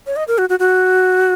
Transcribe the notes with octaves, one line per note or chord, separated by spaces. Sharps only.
C#5
D#5
A#4
F#4
F#4
F#4